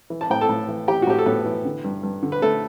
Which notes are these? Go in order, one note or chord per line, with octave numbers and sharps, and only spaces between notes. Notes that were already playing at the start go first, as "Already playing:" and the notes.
E3
A5
A2 G5
A4 A5
A2
E3
E3 G4 G5
F#4
A2 G4
A4
A2 B3 B4
E3
D3
G2
G2
D3
B4
D3 A3 A4